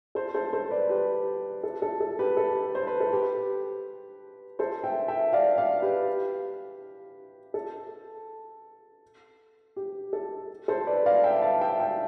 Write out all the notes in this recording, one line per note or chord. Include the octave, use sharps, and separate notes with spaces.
A4 C5
A4 C5
A4 C5
B4 D5
G4 B4
A4
A4
A4
G4 B4
A4
C5
B4
A4
G4 B4
A4 C5
E5 G5
E5 G5
D5 F5
D5 F5
G4 B4
A4
G4
A4
A4 C5
B4 D5
D5 F5
E5 G5
F5 A5
E5 G5
E5 G5